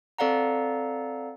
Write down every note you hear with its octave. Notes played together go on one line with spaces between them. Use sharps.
C4 A4 D5 F5 F#5 A#5